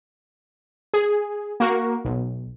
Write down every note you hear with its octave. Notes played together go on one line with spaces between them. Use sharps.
G#4
A#3 F#4 A#4
B1